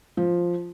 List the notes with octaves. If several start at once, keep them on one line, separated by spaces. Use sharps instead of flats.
F3